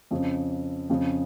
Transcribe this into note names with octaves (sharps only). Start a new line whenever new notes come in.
F2 C#3
F2 C#3